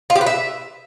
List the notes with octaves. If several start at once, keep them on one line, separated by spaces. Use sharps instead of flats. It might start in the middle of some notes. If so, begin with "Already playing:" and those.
F4
G4
B4
E5